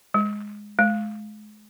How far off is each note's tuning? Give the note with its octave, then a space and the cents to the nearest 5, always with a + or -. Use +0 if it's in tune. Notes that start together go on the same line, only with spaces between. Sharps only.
G#3 +0
G#3 +35